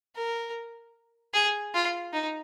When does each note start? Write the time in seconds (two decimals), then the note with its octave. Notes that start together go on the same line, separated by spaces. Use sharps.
0.16 A#4
1.34 G#4
1.74 F4
2.13 D#4